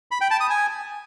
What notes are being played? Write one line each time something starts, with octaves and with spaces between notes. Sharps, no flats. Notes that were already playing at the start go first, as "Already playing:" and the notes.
B5
G5
A5
D#6
G#5